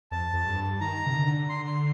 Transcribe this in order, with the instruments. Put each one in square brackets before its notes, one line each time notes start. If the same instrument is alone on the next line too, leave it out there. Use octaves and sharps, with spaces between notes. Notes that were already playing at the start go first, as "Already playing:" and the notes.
[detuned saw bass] F2 [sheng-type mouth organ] A5
[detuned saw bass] F2
G2
[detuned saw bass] D#3 [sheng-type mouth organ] A#5
[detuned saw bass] C3
D3
[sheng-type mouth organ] C6
C6